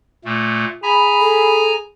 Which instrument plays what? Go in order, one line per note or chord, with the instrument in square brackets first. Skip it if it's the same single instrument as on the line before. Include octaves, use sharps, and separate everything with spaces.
[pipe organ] A#2 A3
[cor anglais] G#4 [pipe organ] G#5 A#5 [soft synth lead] B5
[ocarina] A4